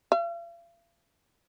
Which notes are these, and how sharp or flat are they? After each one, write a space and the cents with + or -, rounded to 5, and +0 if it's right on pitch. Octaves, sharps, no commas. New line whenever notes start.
F5 -45